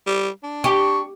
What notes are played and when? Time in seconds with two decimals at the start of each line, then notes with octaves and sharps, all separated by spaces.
0.07 G3
0.43 D4
0.64 G4 C#6